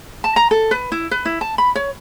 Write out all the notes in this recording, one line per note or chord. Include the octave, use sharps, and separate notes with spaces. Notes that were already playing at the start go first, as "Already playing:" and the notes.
A5
A#5
A4
B4
E4
B4
E4
A5
B5
C#5